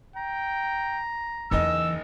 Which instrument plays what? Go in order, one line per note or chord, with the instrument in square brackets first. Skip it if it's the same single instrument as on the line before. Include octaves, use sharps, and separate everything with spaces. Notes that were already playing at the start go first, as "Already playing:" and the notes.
[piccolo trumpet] G5 [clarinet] A#5
[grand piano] F#1 D#4 D#5 [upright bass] E2 E3 [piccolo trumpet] E6